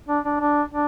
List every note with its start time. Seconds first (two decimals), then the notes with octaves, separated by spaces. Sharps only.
0.08 D4
0.25 D4
0.40 D4
0.72 D4